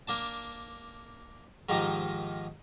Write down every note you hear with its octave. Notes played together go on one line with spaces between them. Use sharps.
A#3 D4 A5
G#2 D#3 F3 D#4 G4 A#5